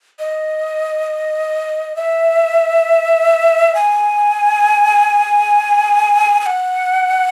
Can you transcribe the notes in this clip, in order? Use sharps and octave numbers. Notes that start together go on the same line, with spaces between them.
D#5
E5
G#5
G#5
F#5